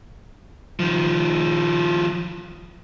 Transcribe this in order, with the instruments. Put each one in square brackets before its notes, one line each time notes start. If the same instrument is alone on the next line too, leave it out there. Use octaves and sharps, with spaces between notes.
[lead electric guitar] D#3 F3